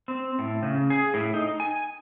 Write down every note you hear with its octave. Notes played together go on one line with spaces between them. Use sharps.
C4
A2
C#3
G#4
A2
D#4
G#5